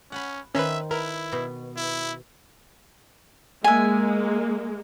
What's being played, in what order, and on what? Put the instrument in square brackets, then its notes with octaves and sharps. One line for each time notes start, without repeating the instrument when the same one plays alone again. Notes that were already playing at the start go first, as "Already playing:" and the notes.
[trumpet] C#4 [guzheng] F#5 B5
[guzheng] D#3 C5 [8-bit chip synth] C#4 B4 [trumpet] E5
[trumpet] E4 [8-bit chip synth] A#4 [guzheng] B4
[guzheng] B2
[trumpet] E4
[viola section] G#3 A#3 [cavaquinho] E5 G#5